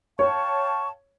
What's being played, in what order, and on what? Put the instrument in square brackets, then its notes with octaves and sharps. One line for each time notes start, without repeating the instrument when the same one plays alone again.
[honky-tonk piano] C#5 [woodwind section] F5 G5 A5 [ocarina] C#6